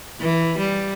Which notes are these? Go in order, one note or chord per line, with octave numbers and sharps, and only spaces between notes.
E3
G3